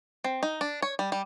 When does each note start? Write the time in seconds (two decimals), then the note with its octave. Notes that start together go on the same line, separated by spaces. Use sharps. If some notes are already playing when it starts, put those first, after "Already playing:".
0.24 C4
0.43 D#4
0.61 D4
0.82 C#5
0.99 G3
1.12 G3